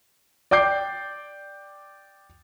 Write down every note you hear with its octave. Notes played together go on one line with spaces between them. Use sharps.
D5 G5 D6 G6 C7